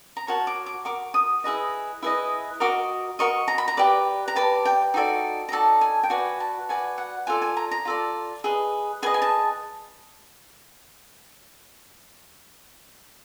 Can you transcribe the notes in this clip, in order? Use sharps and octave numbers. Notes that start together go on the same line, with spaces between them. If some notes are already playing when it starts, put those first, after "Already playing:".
A#5
F#4 A#4 C#5 A5
D6
D6
F#4 A#4 D6
D#6
E4 G#4 B4 D#5
E4 G#4 B4 D#5
F#4 A#4 D#5 D6
F#4 A#4 D#5 C#6
A#5
B5
A#5
G4 B4 D5
A#5
G4 B4 D5 A5
G5
D#4 F#4 A4 D5
A#5
D#4 F#4 A4 D5 A5
G#5
G5
F#4 B4 D5 G#5
A5
F#4 B4 D5 G#5
F#5
F4 A4 D5 G#5
G#5
A#5
A#5
F4 A4 D5
G#4 B4 D#5
G#4 B4 D#5 G#5
G#5
A5